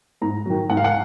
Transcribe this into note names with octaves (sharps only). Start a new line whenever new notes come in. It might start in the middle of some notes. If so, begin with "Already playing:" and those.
G#2 A#5
D#3 F#3
G#2 F#5
F5
F#5